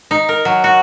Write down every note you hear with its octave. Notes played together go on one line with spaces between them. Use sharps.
D#4
A#4
F#3
F#4